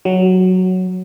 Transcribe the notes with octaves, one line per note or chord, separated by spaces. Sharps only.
F#3